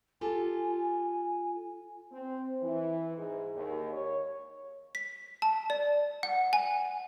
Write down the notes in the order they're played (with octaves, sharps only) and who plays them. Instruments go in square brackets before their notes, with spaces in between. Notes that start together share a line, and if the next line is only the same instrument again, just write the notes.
[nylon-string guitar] F4 G4 A4 [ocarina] G#5
[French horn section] C4
E3
G#2
D#2
C#5
[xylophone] B6
A5
D5
F#5
G#5